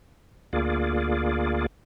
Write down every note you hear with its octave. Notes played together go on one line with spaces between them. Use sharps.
D2 A#3 F4 G#4 D5